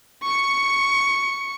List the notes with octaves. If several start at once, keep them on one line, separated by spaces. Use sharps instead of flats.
C#6 C#7